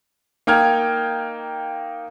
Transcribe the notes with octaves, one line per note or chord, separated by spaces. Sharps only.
A#3 D#4 G5 F6 G#6